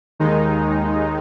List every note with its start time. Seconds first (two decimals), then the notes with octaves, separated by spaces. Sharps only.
0.19 D#2 D#3 G#3 D#4